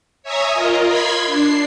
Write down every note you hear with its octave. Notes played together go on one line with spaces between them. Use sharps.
C#5 E5 G#5 A#5 D#6
F4 A#4 D#5
B5 C6 G#6 B6
D4 C7